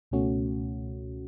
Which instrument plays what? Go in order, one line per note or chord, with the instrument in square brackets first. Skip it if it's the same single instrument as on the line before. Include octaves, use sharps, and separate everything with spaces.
[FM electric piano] C#2 B2 A3 C#4 F#4